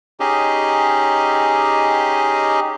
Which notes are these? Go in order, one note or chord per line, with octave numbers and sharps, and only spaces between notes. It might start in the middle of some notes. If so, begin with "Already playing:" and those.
C#4 D#4 G4 G#4 D#5